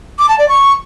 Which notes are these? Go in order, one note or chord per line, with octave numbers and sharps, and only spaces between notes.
D6
A5
D5
C#6